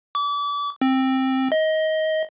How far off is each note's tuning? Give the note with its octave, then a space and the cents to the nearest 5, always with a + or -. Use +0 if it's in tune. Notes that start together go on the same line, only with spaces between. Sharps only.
D6 -35
C4 +10
D#5 +20